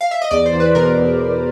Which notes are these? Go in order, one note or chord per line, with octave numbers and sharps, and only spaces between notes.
F5
E5
D#5
E2 D5
C5
E2
B4
B2 A#4
E2
E2